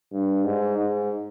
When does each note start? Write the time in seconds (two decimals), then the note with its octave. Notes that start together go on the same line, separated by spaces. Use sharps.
0.12 G2
0.44 G#2
0.77 G#2